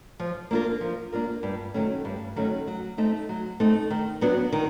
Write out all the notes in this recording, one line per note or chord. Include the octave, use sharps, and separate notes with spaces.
F3
A#3 D4 F4 A#4
F3
A#3 D4 F4 A#4
G2
D#3 F#3 A3 C#4
G2
D#3 F#3 A3 C#4
F#3
A3 C4 D#4
F#3
A3 C4 D#4
D#3
F#3 B3 D4 F#4
D#3